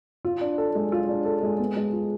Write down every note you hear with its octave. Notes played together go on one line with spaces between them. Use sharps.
F4
D4
A4
G#3
F4
D4
A4
G#3
B3
G#3
F4